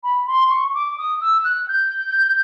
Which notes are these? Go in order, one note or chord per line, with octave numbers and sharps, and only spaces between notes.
B5
C6
C#6
D6
D#6
E6
F#6
G6